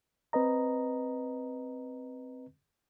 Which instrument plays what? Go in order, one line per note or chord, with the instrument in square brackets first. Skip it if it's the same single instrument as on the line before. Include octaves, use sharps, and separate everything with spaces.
[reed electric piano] C4 B4 D#5 A#5